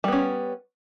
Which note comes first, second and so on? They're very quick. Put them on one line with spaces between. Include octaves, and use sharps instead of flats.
G3 B3 C#4